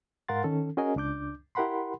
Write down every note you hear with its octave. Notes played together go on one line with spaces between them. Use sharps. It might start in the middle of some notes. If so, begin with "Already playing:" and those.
G#2 A#4 F5 F#5 C6 A6
D#3 C#4 A4
C#4 F#4 G#4 A#4 D#5 G#5
C#2 D4 D6 G6
E4 G4 A#4 F#5 B5 C6